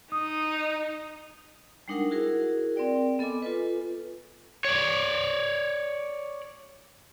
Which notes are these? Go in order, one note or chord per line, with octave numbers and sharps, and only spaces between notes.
D#4 D#6
G3 G#3 D4 D#4 A#4 F#5
E4 F#4 G#4 A#4
C4 A#4 D5 G5
B3 A4 D#5 G#5 D6
F4 A4 B4
C#5 D5